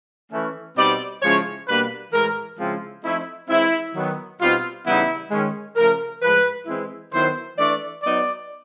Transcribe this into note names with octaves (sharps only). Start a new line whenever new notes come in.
E3 A3 C#4
B2 G3 C4 D#4 D5
C#3 F3 G#3 C#4 E4 C#5
B2 G3 A#3 D4 B4
A2 E3 G#3 A#4
C#3 F3 G#3 C4 E4 F4
F3 A3 C4 D#4 E4
E3 G#3 C4 E4
D#3 F#3 B3
B2 G3 C4 D#4 F4
C#3 E3 G3 B3 D#4 E4
D#3 G#3 C#4
C#3 F3 A3 A#4
A2 F3 G#3 B4
E3 G#3 C4 E4
D#3 F#3 B3 E4 C5
E3 A3 D4 D5
F#3 B3 D#4 D5